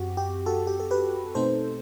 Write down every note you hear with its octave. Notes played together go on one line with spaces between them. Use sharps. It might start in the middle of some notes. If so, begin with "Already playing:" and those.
Already playing: F#2 C4 F#4 G4
G4
F#4 A4
G4
A4
G4 B4
B2 A3 C4 D#4 A4 C5